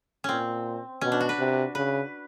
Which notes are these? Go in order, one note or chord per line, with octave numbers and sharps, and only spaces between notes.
A#2 C4 C#4
B2 C#4
D4
F#4
B4
C3
C#3 B4